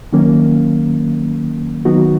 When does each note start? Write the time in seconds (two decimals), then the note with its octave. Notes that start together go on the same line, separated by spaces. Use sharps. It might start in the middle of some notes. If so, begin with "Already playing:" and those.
0.13 D#3 F#3 A#3 C#4
1.85 D#3 F#3 B3 D#4 F#4